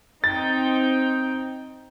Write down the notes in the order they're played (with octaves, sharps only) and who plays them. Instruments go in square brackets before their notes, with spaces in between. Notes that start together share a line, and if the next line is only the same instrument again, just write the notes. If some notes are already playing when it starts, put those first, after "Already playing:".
[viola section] C4 D#4 G5 [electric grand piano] A6